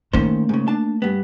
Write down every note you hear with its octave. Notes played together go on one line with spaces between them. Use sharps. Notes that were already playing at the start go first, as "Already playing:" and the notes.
D#3 A3 A#3 C#4 C5
G#2 C#3
D4 A5
G2 B3